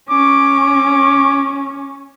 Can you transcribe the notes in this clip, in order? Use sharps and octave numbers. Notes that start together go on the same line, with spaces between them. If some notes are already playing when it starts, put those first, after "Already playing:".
C#4 D6